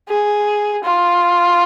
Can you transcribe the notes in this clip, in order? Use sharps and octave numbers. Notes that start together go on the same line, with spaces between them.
G#4
F4